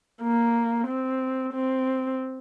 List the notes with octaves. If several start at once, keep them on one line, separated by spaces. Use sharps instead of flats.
A#3
C4
C4